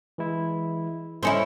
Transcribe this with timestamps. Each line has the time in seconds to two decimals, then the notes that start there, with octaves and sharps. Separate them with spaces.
0.18 E3 G#3 E4
1.23 C4 C#4 E4 A4 C5 D#5